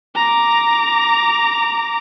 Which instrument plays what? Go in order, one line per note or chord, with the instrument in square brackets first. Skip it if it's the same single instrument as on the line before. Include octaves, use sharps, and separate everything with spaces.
[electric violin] A#5 D6